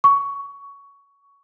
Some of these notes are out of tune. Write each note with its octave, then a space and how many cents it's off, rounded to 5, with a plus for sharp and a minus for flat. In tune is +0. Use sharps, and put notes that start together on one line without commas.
C#6 +15